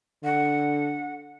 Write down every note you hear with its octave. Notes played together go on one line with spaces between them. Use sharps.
D3 F#5